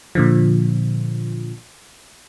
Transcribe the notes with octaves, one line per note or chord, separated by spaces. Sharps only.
A#2 D3 F3